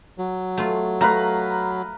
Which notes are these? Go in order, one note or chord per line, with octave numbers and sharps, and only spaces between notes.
F#3
A3 F4
A3 B4 F5 A#5